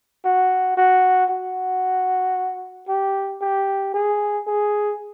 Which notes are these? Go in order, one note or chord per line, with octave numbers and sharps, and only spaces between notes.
F#4
F#4
F#4
G4
G4
G#4
G#4